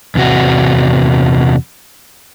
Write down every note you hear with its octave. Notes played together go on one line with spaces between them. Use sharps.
E2 C3 F#4